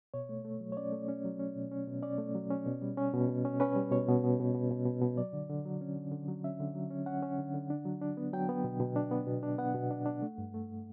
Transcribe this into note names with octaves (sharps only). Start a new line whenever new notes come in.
B2 C#5
A3
A3
F#3
C#5
C#4 D5
A3
C#4
F#3
C#4
B2
C#4
B2
C#4 D5
A3
F#3
C#4
B2
G3
C#4
B2
B2
C#4
C#4 B4
G3
B2 C#5
B2
B2
B2
B2
B2
B2
B2
F#3 D5
D3
D3
F#3
C#4
D3
D3
F#3
C#4 E5
D3
F#3
C#4
C#4 F#5
C#4
D3
D3
D4
F#3
D4
B3
F#3 G5
B3
B2
B2
D4
B3
B2
D4
B3 F#5
B2
D4
D4
A3
G2
A3